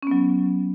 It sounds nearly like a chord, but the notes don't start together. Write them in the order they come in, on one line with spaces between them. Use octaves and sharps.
C#4 B3 F#3